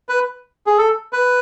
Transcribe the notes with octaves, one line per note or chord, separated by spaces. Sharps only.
B4
G#4
A4
B4